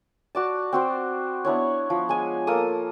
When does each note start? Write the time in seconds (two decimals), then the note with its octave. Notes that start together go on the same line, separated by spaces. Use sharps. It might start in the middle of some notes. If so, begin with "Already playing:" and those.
0.35 F#4 D5 A5
0.73 C4 F#4 C5
1.45 B3 D4 E4 C#5
1.90 F3
2.09 G#3 G#5
2.47 A#3 A4 D#6